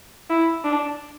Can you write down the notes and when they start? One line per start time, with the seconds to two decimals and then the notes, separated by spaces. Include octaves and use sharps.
0.29 E4
0.64 D4